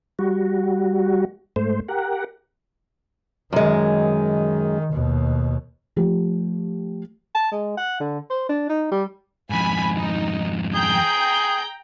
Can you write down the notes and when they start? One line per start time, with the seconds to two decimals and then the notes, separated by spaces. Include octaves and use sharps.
0.19 G3 F#4
1.56 G#2 A3 C5
1.88 G4 A#4 F#5
3.53 F#2 D#3 G#3
4.92 D#2 B2
5.96 F3 A3 G4
7.35 A5
7.51 G#3
7.77 F#5
8.00 D3
8.30 C5
8.49 D4
8.69 D#4
8.91 G3
9.50 F2 G#2 G#5 B5
9.94 D#4
10.74 G#4 G5 A#5 G6